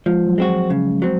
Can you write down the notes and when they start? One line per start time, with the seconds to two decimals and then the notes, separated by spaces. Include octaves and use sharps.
0.06 F3 G#3
0.27 F#3
0.38 G#3 C4 F#4
0.49 F3
0.70 C#3 F#3
0.91 G#3
1.02 F#3 C4